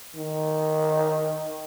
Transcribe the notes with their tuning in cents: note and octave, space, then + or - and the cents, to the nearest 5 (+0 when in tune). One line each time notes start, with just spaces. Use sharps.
D#3 +0